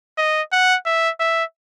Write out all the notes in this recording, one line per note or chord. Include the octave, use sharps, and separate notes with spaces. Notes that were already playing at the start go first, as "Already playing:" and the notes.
D#5
F#5
E5
E5